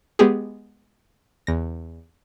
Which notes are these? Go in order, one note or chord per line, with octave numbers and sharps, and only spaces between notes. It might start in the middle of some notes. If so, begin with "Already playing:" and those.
G#3 B3 G4 G#4
E2 A#6